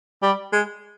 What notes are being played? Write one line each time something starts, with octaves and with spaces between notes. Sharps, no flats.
G3
G#3